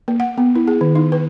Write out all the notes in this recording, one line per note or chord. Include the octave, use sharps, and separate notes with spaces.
A#3
F#5
B3
E4
G#4
D#3
D#4
B4